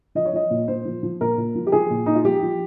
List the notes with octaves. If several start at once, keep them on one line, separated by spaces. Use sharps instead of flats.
F3 D#5
C#5
F3 D#5
A#2
A#2 C5
F3
F3
A#2 A#4
A#2
F3
G4
F3 G#4
A#2
A#2 D#4
F4
F3 G4
F3